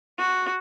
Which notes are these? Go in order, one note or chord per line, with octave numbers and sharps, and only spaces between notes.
F#4